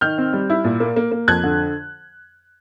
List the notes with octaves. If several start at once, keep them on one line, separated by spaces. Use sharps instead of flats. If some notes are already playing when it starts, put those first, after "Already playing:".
D#3 F6 G6
C4
G3
E4
A#2
A#3
A#3
A#3
F2 F#6 G#6
D3